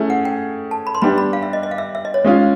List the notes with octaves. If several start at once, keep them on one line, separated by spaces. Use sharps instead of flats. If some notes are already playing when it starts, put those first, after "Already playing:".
Already playing: A3 C#4 E4 G#4
F#5
G5
A5
B5
C6
G3 B3 D4 G4 B5
B5
F5
E5
D#5
D#5
F5
E5
E5
D#5
C#5
G#3 C#4 F4